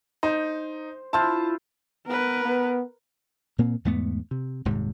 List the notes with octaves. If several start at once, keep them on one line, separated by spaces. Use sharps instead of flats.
D#4 C5
E4 F4 C5 A5
B3 A#4 B4
B3
A#2 A#3 C4
E2 G#2 A3 B3
C3
D#1 G#2 C3